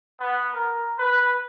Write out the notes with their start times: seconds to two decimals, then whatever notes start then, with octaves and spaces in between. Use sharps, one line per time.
0.19 B3
0.53 A#4
0.98 B4